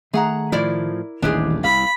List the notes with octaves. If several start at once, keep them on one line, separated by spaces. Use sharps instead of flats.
D#3 A3 G#4 E5 F#5 A#5
A2 F3 E4 A#4 D5
D#1 A1 D#2 D#3 E3 D4 G4 G#4
C2 F5 B5